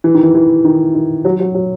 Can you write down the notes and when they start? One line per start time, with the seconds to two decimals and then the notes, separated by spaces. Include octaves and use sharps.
0.04 E3
0.14 D#3
0.24 E3
0.35 E3
0.64 D#3
0.95 D#3
1.25 F#3
1.40 F#3
1.54 F#3